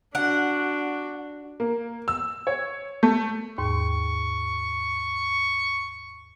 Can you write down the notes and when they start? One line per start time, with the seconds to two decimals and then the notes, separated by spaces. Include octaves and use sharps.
0.15 D4 F#4 F#5
1.60 A#3
2.08 E6
2.47 C#5
3.03 A3
3.58 D#2 G#2 C#6